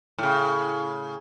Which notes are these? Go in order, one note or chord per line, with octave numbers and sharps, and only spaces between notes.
A2 C#3